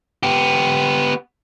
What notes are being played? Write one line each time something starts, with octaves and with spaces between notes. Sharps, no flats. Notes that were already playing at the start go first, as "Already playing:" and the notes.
B3 G4